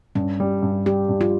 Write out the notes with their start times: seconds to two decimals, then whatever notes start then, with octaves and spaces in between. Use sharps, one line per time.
0.15 G2 C#4
0.40 G3
0.62 G2
0.86 G3 G4
1.09 G2
1.21 F4